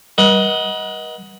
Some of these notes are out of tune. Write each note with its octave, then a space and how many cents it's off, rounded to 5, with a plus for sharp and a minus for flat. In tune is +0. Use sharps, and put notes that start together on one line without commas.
B4 -45 D#5 +20 F#5 +0